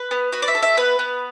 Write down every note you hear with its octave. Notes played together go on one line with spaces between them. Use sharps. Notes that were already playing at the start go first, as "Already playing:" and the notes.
Already playing: B4
B3
F#4 B4
D5
E5
A4
E5
B3 B4
B3